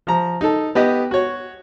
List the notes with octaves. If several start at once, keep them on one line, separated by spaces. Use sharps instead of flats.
F3 A#5
D#4 A4
B3 G4 D#5
F#4 C#5